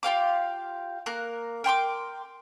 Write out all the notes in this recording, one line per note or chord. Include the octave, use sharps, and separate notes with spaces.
F4 G4 F5 D6
A#3 A#4 F#6
A#4 G5 C6 D6